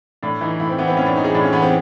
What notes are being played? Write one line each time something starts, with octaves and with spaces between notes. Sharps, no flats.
A2 D4
E3 D#4
A2 E4
C4
E3 B3
C4
A2 C#4
D4
E3 D#4
G#4
A2 D4
C#4
E3 B3
C4